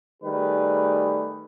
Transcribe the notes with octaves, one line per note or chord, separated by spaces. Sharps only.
D#3 G3 A3 G#4 B4